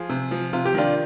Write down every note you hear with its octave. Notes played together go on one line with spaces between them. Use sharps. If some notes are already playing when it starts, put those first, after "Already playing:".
Already playing: F3 F4 G#4
C3
F3
C3 F4
G4
D#3 D4 F4